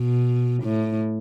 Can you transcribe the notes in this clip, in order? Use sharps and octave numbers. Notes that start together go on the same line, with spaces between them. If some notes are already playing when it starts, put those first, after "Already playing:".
Already playing: B2
A2